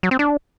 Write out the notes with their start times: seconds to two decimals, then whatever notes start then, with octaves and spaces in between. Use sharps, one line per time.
0.03 F#3
0.11 C4
0.19 D4